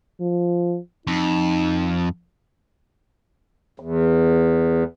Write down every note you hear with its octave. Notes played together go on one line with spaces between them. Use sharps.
F3
F2 D#4
E2